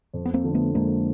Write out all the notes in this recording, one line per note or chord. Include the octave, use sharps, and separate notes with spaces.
F2
B3
A#3 C4
D3 F3
A3 B3
F2 G#3 A#3